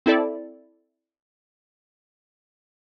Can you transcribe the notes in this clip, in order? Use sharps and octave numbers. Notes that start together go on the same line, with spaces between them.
C4 E4 A4 D5